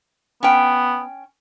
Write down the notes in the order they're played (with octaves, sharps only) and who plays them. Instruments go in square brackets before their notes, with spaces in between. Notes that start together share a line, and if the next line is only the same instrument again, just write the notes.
[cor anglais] B3 [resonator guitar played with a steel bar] C#4 G5